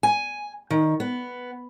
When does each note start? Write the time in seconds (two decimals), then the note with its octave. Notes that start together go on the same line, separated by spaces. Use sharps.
0.03 G#5
0.70 D#3
1.00 B3